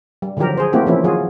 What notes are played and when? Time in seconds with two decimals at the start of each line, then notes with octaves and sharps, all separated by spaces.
0.22 G3
0.37 D3 D#3 F3 F#3 G4 A#4
0.57 G#4 C5
0.73 A3 A#3 C4 E4 F#4 G4
0.86 E3 F3 A#3 C#4 E4
1.04 D#3 F#3 F4 F#4 G#4